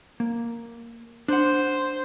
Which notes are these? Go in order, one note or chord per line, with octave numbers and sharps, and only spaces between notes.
A#3
D4 C5 F#5